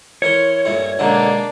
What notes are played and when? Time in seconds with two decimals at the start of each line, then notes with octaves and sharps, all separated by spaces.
0.22 E3 A#4 C#5 C6
0.65 G2 A#2 A3
0.99 B1 D3 G#3 A#3 D4 A5